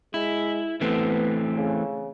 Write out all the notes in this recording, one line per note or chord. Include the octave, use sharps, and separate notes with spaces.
G#3 E4
E3 A3 B3 C4
C#3